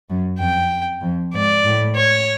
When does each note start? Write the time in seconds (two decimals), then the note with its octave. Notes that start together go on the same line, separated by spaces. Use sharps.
0.09 F#2
0.40 F2 G5
1.02 F2
1.34 G#2 D5
1.65 A2
1.96 C#5